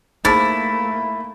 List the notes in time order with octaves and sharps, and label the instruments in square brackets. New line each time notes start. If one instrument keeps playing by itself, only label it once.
[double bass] A3 A#3 [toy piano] D#4 G#4 C5 [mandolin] E4 [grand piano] B5 A6